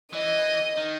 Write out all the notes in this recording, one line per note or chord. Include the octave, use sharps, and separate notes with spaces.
E3 D#5
D#3